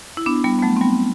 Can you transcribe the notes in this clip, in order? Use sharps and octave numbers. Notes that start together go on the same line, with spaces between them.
E4
B3 D4
G3 B3
B3
F#3 A3
C4
G3 B3